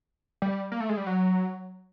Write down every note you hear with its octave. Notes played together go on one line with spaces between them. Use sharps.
G3
A#3
A3
G#3
G3
F#3